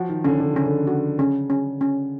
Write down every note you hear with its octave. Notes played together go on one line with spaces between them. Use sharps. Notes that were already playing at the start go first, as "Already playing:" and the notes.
Already playing: F3 F#4
D#3
D3 C#4
D3
C#3 C#4
D3
F#4
C#3 C#4
C#4
C#4